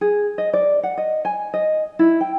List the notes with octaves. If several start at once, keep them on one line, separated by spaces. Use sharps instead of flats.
G#4
D#5
D5
F#5
D#5
G#5
D#5
E4
G5